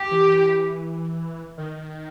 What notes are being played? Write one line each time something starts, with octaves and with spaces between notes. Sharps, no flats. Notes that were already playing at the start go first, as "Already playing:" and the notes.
Already playing: G4
E3
D#3